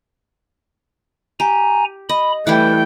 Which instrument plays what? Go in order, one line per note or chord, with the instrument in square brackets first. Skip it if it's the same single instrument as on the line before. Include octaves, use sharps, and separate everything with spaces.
[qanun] G4 [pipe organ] G#5 A#5
[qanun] D#5 [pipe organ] B5
[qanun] E3 G3 E4 [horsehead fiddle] A3 G5 [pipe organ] B4